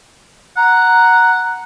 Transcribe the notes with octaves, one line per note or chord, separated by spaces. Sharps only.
F#5 A#5